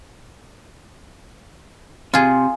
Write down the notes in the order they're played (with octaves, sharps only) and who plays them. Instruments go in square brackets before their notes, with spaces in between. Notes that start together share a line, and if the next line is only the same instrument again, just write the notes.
[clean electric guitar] C3 [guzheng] F4 G#4